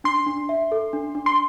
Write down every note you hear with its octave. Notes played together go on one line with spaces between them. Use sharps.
D4 C6
D4
E5
A4
D4
D4
C6